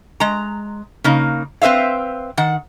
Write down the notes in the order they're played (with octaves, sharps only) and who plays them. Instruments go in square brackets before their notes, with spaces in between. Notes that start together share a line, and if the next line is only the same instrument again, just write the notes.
[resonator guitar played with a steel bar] G#3 A#5
C#3 A#3 D#4
C4 B4 C5 E5 F5
D#3 F#5